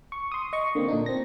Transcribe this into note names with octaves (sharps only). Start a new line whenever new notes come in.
C#6
C6 D#6
D#5 C#6
D3 A#3 C4
A#2 D4 D#4
C4 A#6